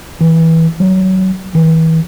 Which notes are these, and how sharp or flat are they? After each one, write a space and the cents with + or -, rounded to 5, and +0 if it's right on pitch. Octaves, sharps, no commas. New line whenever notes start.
E3 -20
F#3 +25
E3 -35